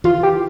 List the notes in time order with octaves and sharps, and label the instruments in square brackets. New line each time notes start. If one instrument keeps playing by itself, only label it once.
[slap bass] E3 [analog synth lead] F4
[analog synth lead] G4